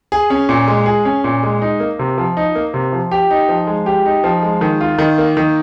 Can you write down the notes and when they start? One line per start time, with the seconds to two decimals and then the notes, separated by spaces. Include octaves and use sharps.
0.12 G#4
0.30 C#4
0.49 A#2
0.68 G#3
0.86 G#4
1.05 C#4
1.24 A#2
1.43 G#3
1.62 D#4
1.80 A#3
1.99 C3
2.18 F3
2.37 D#4
2.55 A#3
2.74 C3
2.93 F3
3.11 G4
3.31 D#4
3.49 F3
3.67 G#3
3.86 G4
4.06 D#4
4.24 F3
4.43 G#3
4.61 D#3
4.81 F4
4.99 D#3
5.18 A#3
5.37 D#3